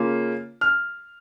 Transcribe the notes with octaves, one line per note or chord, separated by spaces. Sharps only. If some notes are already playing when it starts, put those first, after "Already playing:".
Already playing: C#3 A#3 F4
F6